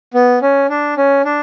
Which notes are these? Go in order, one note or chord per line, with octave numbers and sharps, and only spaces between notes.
B3
C#4
D4
C#4
D4